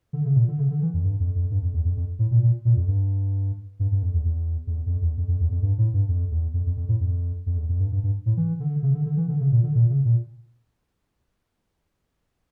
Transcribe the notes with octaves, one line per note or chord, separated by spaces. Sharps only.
D3
C#3
A#2
D3
C#3
D3
E3
F2
G2
F2
F2
G2
F2
E2
F2
F2
A2
A#2
A#2
A#2
F2
G2
G2
G2
F2
E2
E2
F2
E2
F2
E2
F2
F2
E2
F2
G2
A2
G2
F2
E2
F2
F2
F2
A2
F2
F2
E2
F2
G2
G2
G2
A2
E3
D3
C#3
D3
D3
E3
D3
C#3
A#2
D3
A#2
C#3
A#2